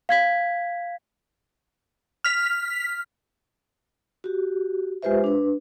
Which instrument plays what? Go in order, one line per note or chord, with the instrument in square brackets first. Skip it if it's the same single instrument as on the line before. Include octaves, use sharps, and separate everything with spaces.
[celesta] F5 G#6 B6
[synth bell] F6 B6
[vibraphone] F#4 G4
G#3 F4 G4 B4 C5 E5
D4 B4